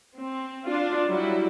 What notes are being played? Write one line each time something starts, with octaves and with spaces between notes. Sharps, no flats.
C4
D4 F4
F#3 G3 E4